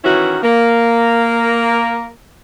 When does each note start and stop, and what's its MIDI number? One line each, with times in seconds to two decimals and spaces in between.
0.05 0.38 51
0.05 0.38 52
0.05 0.38 61
0.05 0.38 64
0.05 0.38 66
0.43 2.12 58